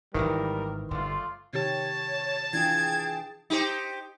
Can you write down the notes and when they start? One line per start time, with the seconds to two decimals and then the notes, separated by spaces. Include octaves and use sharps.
0.14 D1 G#1 D#3 E3 G3 A#4
0.91 G1 A3 F4 D5 C6
1.53 C3 D#3 G4 C#5 A5
2.53 E3 D4 F4 G#4 G5 G#6
3.50 D#4 G4 C5